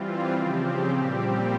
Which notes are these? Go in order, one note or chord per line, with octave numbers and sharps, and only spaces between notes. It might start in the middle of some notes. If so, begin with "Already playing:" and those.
Already playing: E3 G3 C4 F4
C#3 F3 C4 G4
A#2 G3 C4 G4